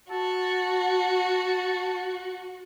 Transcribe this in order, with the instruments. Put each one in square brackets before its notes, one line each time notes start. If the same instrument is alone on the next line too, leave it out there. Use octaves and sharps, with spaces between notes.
[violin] F#4 [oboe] A5